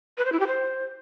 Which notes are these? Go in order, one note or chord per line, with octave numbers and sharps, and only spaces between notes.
B4
C5
E4
G4
C5